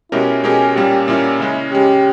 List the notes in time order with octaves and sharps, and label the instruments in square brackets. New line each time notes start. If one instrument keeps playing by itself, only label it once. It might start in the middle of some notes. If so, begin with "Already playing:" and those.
[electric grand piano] B2 G#3 C#4 G4 A#4 [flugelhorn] E4
[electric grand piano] B2 G#3 C#4 G4 A#4 [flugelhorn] G#4
[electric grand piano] A#2 G3 A#3 C#4 [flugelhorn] G4
[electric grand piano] A#2 G3 A#3 C#4 [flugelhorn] E4
[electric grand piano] C#3 G#3 C#4
[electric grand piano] C#3 G#3 C#4 [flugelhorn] G4